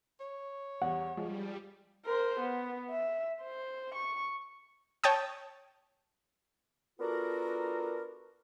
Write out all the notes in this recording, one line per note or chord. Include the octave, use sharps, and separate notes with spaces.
C#5
E2 G3 F#5
F3 G3 G#3 G#4
A#4 C5
B3
E5
C5
C#6
C#5 G5 A5 D#6
B3 D4 F4 F#4 A4 A#4